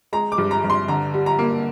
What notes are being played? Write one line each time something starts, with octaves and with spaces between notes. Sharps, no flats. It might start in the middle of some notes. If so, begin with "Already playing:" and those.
G#3 A#5
D6
G2
A#5
G2
C6
D3 A#5
G3
A#5
A#3